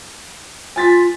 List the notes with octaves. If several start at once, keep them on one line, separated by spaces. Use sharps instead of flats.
F4 G#5 A6 B6